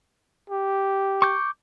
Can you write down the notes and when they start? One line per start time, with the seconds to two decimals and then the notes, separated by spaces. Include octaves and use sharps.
0.50 G4
1.22 C#6 D6 G6